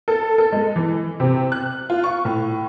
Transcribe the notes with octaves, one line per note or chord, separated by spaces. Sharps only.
A4
A4
G#3
E3
C3
F#6
F4
C#6
A2